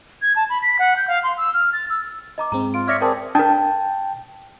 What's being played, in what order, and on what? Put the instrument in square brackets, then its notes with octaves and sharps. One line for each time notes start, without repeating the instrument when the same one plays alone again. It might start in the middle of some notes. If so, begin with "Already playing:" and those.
[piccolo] G#6
A5
B5
B6
F#5
G6
F5
C6
E6
F6
A6
E6
[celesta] D#5 A#5 D6
[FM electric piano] G#2 G#3 C4 [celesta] A#5
[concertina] F4 [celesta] D7
[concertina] C#5 D5 E5 [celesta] F6 A#6 C#7
[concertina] C4 G#4 D5 [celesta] A#4 A5 [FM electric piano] G5
[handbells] D4 A#4 [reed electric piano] G5 A5